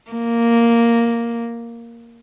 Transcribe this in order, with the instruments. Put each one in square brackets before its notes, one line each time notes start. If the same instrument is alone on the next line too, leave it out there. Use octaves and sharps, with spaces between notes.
[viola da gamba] A#3